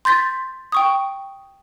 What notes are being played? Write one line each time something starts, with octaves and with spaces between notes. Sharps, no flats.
C6 G6 A6 B6
G5 C#6 D#6